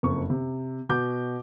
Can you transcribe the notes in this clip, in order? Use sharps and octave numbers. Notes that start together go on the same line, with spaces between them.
F#1 F2 C#6
C3
B2 F#4 D6 G6